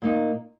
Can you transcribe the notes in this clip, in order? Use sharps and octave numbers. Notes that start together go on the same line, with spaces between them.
A#2 A#3 D#4